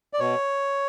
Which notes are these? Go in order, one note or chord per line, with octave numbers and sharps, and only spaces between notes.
D5
B2 C#5